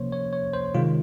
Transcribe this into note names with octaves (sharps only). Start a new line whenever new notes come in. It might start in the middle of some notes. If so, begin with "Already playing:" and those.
Already playing: C3 F3 A#3 C#4 C5 C#5
C#5
C#5
C5
C3 D#3 G#3 F4